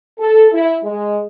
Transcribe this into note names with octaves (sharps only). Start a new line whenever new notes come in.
A4
E4
G#3